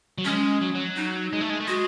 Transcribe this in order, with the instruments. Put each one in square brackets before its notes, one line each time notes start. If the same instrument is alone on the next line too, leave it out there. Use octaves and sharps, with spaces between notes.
[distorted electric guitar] F#3
[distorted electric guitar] G#3 [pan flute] C#4
[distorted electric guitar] F#3
F#3
[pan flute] D#4
[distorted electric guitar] G#3
A3
G#3
A3
[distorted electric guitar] G#3 [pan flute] F#4